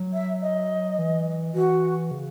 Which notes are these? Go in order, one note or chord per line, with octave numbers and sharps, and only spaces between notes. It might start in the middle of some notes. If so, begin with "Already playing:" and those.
Already playing: F#3
E5
D#5
E3
E3 F#4
C#3